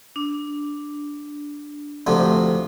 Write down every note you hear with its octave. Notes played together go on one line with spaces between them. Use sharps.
D4
D2 C3 F3